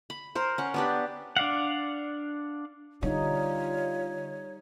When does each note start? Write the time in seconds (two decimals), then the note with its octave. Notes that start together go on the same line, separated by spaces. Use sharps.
0.10 B5
0.35 A#4 C5
0.58 C#4 F#5
0.74 B3 D4 G4
1.37 D4 D5 F5 F#5
3.03 D3 G3 D#4 F4 C#5